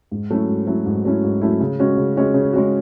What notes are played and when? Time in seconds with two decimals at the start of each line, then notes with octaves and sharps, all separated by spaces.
0.12 G#2
0.30 F#3 A3 C#4 E4
0.48 G#2
0.67 F#3 A3 C#4 E4
0.86 G#2
1.05 F#3 A3 C#4 E4
1.23 G#2
1.41 F#3 A3 C#4 E4
1.60 C#3
1.79 G#3 C#4 F#4
1.97 C#3
2.16 G#3 C#4 F#4
2.34 C#3
2.53 G#3 C#4 F#4